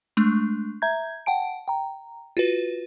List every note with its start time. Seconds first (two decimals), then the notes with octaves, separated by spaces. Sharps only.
0.17 G#3 A3 D4
0.82 E5 A#5 G6 G#6
1.26 F#5 G5 A5 D7
1.68 G5 A#5
2.37 F4 F#4 B4